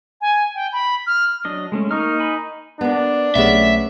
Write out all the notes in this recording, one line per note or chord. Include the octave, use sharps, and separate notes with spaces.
G#5
G5
B5
F6
F#3 D4 D#5
G#3 A3 C#4
A#3 D#4 C#6 F6
G#5 B5
B3 D4 A#4
B1 A3 B3 C#4 G#4 E5